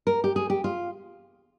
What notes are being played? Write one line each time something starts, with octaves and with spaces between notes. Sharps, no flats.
A#4
G4
G#4
G4
F4